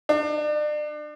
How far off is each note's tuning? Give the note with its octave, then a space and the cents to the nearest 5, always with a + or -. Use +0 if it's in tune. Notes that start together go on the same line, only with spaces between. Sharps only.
D4 +35